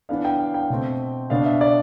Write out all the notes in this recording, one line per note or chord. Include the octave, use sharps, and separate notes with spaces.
E3 B3 D4 F5
G5
F5
G5
B2 A3 C4
B2 B3 D4 F5
E5
D5